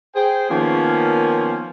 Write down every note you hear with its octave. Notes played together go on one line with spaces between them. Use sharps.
G#4 C5 G5
D#3 F3 A#3 B3 C#4